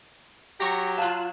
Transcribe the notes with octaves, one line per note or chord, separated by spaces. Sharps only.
F#3 G4 A#5 C#6 A#6
F4 F5 A5 F#6 E7